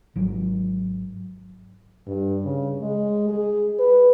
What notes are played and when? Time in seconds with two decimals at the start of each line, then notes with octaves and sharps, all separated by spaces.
0.16 G#1 F#3
2.07 G2
2.45 C#3
2.82 G#3
3.29 G#4
3.79 B4